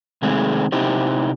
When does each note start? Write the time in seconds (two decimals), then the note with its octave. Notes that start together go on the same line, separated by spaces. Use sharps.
0.22 C3 D#3 G#3 A3 C4 G#4
0.72 C3 D#4 E4 G4 C5